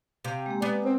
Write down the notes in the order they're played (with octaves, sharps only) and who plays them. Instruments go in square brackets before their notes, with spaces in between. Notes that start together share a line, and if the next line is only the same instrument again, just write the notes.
[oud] C3 [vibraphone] F5
[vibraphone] G#3 A#3 G4
[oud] B3 [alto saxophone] D5
[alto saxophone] C4